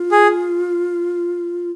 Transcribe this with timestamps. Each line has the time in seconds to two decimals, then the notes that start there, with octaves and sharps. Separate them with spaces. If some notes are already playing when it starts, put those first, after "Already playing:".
Already playing: F4
0.12 G#4